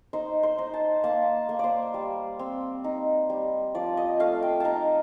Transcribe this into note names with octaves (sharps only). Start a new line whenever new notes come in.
D#4 C5
C5
D#4
A5
A#3 A5
A#3
C5 D5
G3
C4
D#4
G3
F3 D5
D#5
A3 F5
G5
D#4 A5 A#5